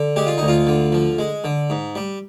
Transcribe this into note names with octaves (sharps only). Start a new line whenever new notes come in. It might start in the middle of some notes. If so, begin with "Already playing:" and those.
Already playing: D3
G#3 G4
F4
D2 D#4
F4
D3
F3
G#3
D3
G#2
G3